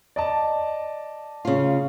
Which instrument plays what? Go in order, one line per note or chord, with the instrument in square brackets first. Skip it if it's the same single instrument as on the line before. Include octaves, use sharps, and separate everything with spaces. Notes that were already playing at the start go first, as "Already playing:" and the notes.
[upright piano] D5 D#5 A5
[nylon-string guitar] C#3 F4